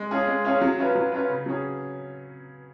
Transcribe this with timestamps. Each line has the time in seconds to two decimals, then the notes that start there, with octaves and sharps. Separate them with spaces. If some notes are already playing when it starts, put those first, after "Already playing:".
Already playing: G#3
0.11 C#4 F4 G#4 C#5
0.28 G#3
0.45 C#4 F4 G#4 C#5
0.61 F#3
0.78 C#4 F4 B4
0.95 F#3
1.12 C#4 F4 B4
1.29 C#3
1.46 F#3 C#4 G#4